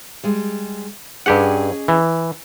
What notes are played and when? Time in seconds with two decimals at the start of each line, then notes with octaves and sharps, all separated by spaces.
0.23 G3 G#3
1.26 G2 C#4 G4 G#4 D#5 F#5
1.88 E3